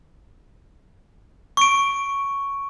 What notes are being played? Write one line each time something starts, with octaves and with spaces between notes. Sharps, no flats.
C#6 D7